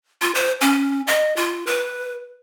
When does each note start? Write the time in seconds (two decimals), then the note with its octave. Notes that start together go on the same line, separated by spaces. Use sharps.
0.22 F4
0.35 C5
0.61 C#4
1.07 D#5
1.36 F4
1.67 B4